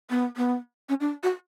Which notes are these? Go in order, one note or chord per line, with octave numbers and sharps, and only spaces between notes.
B3
B3
C#4
D4
F#4